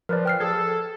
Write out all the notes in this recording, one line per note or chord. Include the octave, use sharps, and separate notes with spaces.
F3 A#4 B4 D5
G5 F6 C7
G#4 A4 G#6